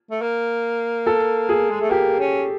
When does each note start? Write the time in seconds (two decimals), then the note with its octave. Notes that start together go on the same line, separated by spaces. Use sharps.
0.11 A3
0.22 A#3
1.06 A4
1.49 G#4
1.70 G#3
1.81 A3
1.91 A#3 G4
2.20 C#4